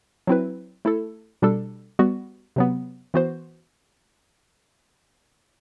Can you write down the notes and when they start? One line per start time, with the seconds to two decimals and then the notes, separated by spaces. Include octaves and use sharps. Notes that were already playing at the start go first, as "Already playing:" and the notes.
0.27 F#3 C4 E4 B4
0.85 A3 E4 A4
1.42 B2 G3 D4 A4
1.99 G3 B3 F#4
2.56 C3 F#3 B3
3.14 E3 B3 F#4 C5